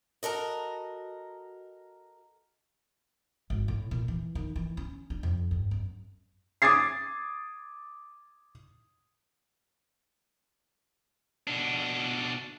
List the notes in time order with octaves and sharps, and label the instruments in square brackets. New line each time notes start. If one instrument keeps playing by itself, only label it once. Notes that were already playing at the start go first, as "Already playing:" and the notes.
[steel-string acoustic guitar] F#4 A4 A#4 D#5
[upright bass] G#1
A2
A#2
E3
D#3
E3
C#4
D4
F2
G2
F#2
[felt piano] D6 D#6 G#6 A6 C7
[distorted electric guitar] B2 D4